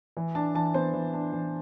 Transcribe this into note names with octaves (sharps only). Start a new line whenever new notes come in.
E3
D4 A5
E3 A5
B3 C5
E3
D4
E3